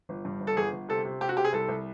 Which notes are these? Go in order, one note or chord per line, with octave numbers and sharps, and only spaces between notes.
G1
G2
G1
A4
G1 G#4
G1
C3 A4
C3
C3 G4
F#4
C3 G4
G#4
C2 A4
C2